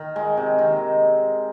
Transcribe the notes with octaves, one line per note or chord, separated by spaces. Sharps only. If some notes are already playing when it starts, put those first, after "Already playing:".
Already playing: D#3
G#3
C3
D#3